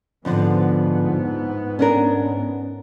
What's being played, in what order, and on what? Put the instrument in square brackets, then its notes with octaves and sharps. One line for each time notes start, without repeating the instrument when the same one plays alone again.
[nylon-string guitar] F2 D3 F3 [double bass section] G#2 B3
[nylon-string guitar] C#4 D4 A#4